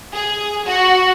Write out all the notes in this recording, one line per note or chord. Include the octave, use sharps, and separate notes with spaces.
G#4
F#4